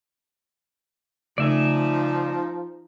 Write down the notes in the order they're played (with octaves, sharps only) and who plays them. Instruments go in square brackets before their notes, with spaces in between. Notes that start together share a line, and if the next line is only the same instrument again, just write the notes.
[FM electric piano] C#3 A3 [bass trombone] F3 [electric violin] D#4 [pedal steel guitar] D5 E5 G#5